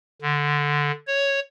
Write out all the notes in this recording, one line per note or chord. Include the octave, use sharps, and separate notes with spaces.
D3
C#5